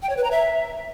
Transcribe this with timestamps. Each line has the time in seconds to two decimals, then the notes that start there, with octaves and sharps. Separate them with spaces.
0.02 G5
0.09 C#5
0.17 B4
0.24 A#5
0.31 E5